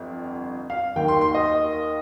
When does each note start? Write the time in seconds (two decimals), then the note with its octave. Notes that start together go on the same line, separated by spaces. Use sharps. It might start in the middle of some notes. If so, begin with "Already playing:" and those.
Already playing: G1 F2
0.70 F5
0.96 D#2 D#3 A#3 G5
1.08 C6
1.21 C6
1.35 D#5